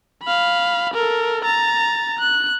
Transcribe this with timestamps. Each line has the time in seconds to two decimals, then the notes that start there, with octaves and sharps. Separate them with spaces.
0.24 F5 B5
0.94 A4 A#4
1.44 A#5 A6
2.19 F#6